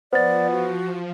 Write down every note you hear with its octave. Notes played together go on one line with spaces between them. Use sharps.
F3 B3 C5 D5 A6
F#4